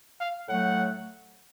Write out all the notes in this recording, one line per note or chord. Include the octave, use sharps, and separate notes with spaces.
F5
A2 F#3 A3 F#5